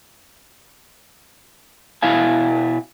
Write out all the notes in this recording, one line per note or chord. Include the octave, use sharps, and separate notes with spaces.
B2 E4 F5 G#5